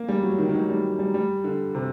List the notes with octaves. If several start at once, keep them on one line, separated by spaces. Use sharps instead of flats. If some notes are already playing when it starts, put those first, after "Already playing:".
Already playing: A#3
G3
F#3
D#3
D#3
F#3
G3
G3
G3
D3
C3